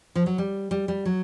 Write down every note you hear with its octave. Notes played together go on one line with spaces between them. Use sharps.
F3
F#3
G3
G3
G3
F#3